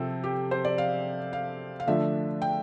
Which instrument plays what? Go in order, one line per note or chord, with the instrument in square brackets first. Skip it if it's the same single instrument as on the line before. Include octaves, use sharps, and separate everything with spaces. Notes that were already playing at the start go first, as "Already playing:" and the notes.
Already playing: [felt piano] C3 F3 C4 A4
G4
C5
D5
F5
F5
F5
D3 F3 A3 D4 E5
G5